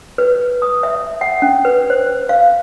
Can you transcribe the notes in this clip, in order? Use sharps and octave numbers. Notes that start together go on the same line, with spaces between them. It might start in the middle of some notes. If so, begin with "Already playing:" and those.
B4
D#6
E5
F#5
C#4
B4
C5
F5